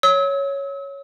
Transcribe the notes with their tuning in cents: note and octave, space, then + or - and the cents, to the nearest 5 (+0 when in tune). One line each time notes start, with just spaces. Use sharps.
C#5 +0 E6 -40